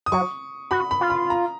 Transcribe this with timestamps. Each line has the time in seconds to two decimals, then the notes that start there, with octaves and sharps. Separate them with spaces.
0.06 D#6
0.12 F#3 C#6
0.71 F#4 B5
0.91 B5
1.01 F4
1.10 B5
1.30 A#5